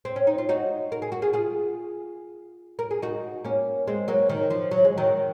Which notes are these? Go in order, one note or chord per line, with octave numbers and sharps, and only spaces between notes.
C4
C#4
D#4
F4
D#4 F#4
A#4
G#4
F#4
F4 G#4
F4 G#4
A#4
G#4
D#4 F#4
A#3 C#4
G#3 C4
F#3 A#3
D#3
F3
F#3
G#3
D#3 F#3